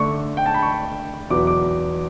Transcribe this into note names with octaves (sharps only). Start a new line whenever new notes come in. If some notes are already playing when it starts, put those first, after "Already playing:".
Already playing: D3 A3 D4 C#6
G5
A5
B5
C#6
E2 B2 F#3 B3 D6
D6